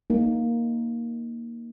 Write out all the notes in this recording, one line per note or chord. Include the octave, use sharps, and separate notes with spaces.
A#3 D#4